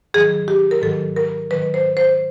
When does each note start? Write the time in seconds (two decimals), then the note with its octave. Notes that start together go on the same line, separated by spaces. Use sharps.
0.14 G#2 D#3 F#3 G#4
0.48 G4
0.71 A#4
0.82 G#2 D#3 F#3 A4
1.16 A#4
1.50 G#2 D#3 F#3 B4
1.74 C5
1.97 C5